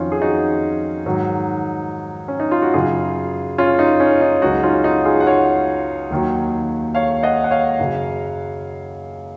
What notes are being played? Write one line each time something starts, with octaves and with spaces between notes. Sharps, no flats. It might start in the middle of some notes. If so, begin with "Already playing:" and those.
Already playing: F2 D#3 F#3 C#4 D#4 F4
G#4
D#4 F#4
G#2 D#3 F#3
C#4
D#4
F4
F#4
F#2 C#3 F#3 F4 G#4
C#4 F4
D#4
C#4
D#4
C#2 C#3 F#3 D#4 F#4
C#4 F4
D#4 F#4
F4 G#4
F#5
C#5 F5
D#2 D#3 F#3
C#5 F5
D#5 F#5
F#5
C#5 F5
F#2 C#3 F#3